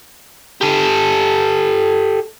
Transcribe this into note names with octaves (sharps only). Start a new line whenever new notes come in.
G4 A4